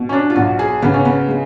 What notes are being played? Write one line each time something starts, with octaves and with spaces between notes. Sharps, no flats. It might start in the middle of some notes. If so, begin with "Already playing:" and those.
Already playing: B2
C#4
D4
F4
B1 F#4
G#4
C#3 B3
C#4
B3
G#3